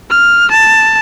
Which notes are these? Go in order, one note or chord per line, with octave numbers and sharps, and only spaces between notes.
F6
A5